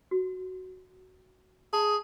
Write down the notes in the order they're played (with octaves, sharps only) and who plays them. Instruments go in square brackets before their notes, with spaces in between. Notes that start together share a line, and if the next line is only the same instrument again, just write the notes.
[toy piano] F#4
[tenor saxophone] G#4 [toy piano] A5